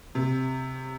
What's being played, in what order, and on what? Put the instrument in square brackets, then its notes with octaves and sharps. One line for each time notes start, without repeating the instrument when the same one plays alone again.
[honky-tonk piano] C3